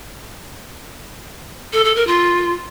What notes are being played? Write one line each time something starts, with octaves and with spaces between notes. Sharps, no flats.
A4
A4
A#4
F4